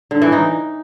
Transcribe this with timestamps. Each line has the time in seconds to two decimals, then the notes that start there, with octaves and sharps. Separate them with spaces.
0.11 D3
0.22 E3
0.32 D#4